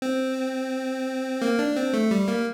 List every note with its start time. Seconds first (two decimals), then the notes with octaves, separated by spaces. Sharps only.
0.02 C4
1.42 A#3
1.59 D4
1.76 C4
1.93 A3
2.11 G3
2.28 A#3